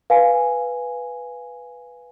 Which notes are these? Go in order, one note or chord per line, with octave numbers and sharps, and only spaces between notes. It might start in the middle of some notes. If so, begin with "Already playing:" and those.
B4 F5 G#5